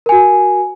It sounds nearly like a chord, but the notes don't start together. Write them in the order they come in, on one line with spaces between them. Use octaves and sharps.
A#4 G#5 F#4